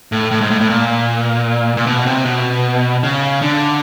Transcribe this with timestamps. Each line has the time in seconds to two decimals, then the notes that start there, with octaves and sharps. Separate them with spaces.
0.12 A2
0.31 A2
0.41 G#2
0.50 A2
0.61 A2
0.70 A#2
1.77 A#2
1.87 B2
2.06 C3
2.25 B2
3.03 C#3
3.42 D3